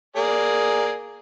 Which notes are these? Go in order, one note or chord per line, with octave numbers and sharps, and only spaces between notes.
A#3 G#4 D5